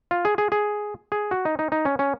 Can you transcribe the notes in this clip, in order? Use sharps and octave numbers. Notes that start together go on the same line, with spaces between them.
F4
G#4
G#4
G#4
G#4
F#4
D#4
D#4
D#4
C#4
C#4